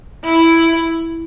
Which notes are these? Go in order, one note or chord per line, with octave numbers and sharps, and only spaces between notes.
E4